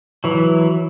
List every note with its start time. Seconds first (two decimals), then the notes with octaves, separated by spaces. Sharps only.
0.24 E3 F#3